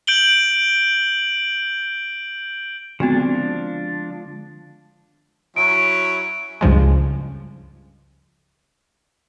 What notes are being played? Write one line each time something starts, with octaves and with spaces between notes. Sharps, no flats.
G6 D7 F#7 G7
D3 F3 G#3 B3 C4 D4 F#4
F#3 C#4 E4 D7
C#2 G2 F3 G#3